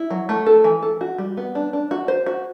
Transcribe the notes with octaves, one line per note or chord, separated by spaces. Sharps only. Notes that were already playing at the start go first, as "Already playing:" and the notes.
Already playing: E4
F#3
A3
A4
E3
A4
F#4
G3
B3
D4
D4
F#4
C5
F#4